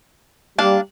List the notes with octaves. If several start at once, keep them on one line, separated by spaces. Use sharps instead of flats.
G3 A#3 D4 F5